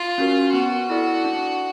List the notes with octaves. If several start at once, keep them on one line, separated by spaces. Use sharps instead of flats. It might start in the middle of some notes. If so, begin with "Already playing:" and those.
Already playing: F4
C#4 F#4 A#4
B3 F#4
E4 A4 D5
D4